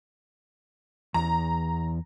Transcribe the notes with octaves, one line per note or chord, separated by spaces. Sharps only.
E2 A#5